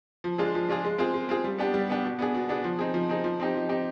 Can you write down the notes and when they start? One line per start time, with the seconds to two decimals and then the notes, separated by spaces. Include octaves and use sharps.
0.24 F3
0.38 G#3 D4 F4 G#4
0.55 F3
0.69 G#3 D4 F4 G#4
0.85 G#3
0.98 C4 F4 G#4
1.14 G#3
1.29 C4 F4 G#4
1.44 G3
1.58 B3 D4 G4
1.74 G3
1.90 B3 D4 G4
2.05 B2
2.19 B3 D4 G#4
2.34 B2
2.49 B3 D4 G#4
2.64 F3
2.79 C4 D#4 G#4
2.94 F3
3.09 C4 D#4 G#4
3.24 F3
3.40 C4 D#4 G4
3.54 F3
3.69 C4 D#4 G4